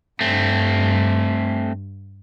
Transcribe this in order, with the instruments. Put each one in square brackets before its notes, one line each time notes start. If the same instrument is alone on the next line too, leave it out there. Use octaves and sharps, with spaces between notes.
[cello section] G2 [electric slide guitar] A3 C4